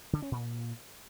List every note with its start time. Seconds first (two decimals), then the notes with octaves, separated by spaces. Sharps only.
0.13 D3
0.22 C#4
0.32 A#2